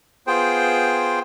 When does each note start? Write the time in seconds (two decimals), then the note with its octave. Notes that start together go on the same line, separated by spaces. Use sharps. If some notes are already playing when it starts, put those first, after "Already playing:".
0.27 B3 F4 G#4 C5 G5